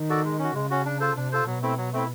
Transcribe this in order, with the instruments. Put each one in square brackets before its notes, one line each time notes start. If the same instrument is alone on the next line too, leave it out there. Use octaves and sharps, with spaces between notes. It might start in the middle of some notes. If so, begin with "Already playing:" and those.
Already playing: [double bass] D#3
[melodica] F#4 A4 D5
G#3
C#4 F#4
[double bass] C#3 [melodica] G#3
[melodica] C#4 F#4
D4
F4 A4 C5
[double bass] C3 [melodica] D4
[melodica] F4 A4 C5
[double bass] B2 [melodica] F#3
[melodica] A3 C4 E4
F#3
A3 C4 E4